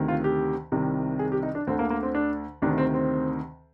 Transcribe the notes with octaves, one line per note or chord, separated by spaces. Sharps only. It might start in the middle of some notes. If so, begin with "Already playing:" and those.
Already playing: D2 C3 D#3
F4
G4
C2 C3 D#3
G#4
G4
D#4
D4
D2 D3 C4
A#3
A#3
C4
D4
D2 C3 D#3 D4
C4
C4